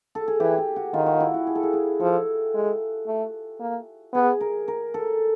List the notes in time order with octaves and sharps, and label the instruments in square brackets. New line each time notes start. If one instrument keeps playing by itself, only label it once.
[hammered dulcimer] A4
G#4
[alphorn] E3 [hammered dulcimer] G4
[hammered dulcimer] G4
F#4
[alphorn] D#3 [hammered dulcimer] F4
[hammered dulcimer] F#4
E4
F#4
G#4
A4
G#4
G#4
[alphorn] F3 [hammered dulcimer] A4
[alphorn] G#3
A3
A#3
[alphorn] B3 [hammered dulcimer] G#4
[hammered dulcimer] A#4
A#4
A4